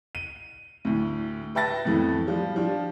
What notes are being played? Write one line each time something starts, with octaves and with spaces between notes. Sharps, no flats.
D#7
D2 A2
B4 E5 G5 A5 A6 A#6
F2 A2 E3 A3 B3
F3 G3
F3 D4 G4